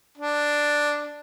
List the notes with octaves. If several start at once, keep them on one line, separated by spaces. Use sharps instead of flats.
D4